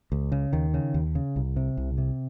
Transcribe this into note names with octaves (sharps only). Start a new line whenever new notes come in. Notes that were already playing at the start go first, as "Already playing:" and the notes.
C#2
C#3
D#2 D#3
C#3
D#2
C#3
C2
C3
C2
C3